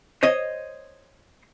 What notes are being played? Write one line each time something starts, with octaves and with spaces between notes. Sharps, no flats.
C5 C#5 D#5